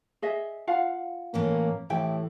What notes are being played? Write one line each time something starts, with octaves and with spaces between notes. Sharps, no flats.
G#4 D#5 E5
F4 F5 F#5
A2 E3 A#3 C#4
A2 E3 E4 G4 G5